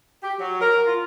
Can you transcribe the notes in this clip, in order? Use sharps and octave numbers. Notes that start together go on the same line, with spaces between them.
G4
F#3
A#4
F4